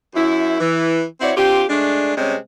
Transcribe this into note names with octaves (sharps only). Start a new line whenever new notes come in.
F#2 E4
E3
C4 E4 F#4 C#5 D5
C4 D4 F4 G4
G#3 A3 D4
C3 G3 G#3 C4 C#4